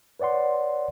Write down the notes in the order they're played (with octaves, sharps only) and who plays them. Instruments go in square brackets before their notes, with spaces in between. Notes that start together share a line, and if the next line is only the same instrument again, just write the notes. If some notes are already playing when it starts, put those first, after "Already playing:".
[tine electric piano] B4 C#5 D5 F#5 C6